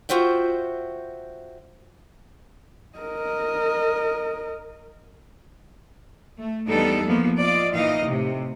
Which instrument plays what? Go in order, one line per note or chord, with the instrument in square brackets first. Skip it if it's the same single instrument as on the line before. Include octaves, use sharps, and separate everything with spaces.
[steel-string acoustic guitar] F4 F#4 C5 E5 G5
[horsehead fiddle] A#4 D#5
[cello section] A3
E2 G3 B3 D4 D#4 A4
F3 A#3 B3
F4 D5 D#5
A#2 E3 D#4 D#5 F5
A2 C3